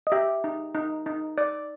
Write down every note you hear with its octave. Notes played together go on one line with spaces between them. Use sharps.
D#5
G4 E5
D#4
D#4
D#4
D5